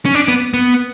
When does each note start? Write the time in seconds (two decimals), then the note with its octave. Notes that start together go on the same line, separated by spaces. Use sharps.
0.05 C#4
0.15 D4
0.28 B3
0.54 B3